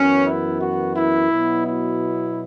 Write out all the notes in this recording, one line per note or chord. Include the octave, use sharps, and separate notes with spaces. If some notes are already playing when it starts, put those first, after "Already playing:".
Already playing: F#2 E3 B3 C#4
E4
F#4
E4
B2 F#3 B3
E4